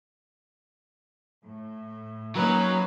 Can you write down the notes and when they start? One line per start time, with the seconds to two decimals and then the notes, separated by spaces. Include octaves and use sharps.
1.44 A2
2.36 F#3 A#3 C#4 D#4 B4 C#5 A#5